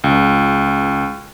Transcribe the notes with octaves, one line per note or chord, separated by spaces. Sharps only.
C#2